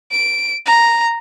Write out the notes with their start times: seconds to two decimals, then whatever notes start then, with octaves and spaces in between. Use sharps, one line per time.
0.11 D7
0.66 A#5